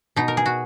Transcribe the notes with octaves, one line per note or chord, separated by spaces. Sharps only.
B2 D#4
A#4
G#4
F#4